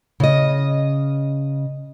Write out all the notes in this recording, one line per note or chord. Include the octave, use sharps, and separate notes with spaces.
C#3 D#5